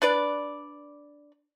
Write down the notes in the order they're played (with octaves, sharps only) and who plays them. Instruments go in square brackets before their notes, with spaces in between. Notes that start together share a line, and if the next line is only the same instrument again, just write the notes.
[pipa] D4 B4 D5